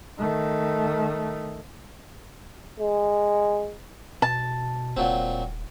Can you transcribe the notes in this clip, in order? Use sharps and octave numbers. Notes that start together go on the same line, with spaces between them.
D#3 A3
G#3
B2 A5
D#1 A#2 F#3 C4